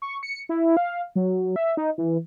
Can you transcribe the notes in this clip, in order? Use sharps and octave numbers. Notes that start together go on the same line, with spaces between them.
C#6
C#7
E4
F5
F#3
E5
D#4
E3